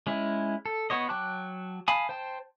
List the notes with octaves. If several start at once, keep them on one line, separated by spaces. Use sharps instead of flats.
G#3 C#4 E4
A4
B3 F#4 C#5 D#5
F#3 G5 A5 D6 F#6
F5 G#5 A5 B5 D#6
C5 G5 A5